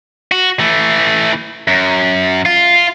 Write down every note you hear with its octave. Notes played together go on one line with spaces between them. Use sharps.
F#4
E3 A3
F#2
F4